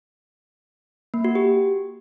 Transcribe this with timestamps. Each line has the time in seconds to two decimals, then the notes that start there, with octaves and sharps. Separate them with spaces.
1.14 A#3
1.25 F#4
1.35 G4